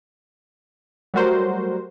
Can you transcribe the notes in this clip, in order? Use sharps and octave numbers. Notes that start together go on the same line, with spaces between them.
F#3 G3 A3 F#4 A#4 C5